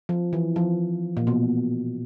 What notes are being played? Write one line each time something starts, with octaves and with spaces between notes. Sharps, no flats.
F3
E3
F3
A#2
B2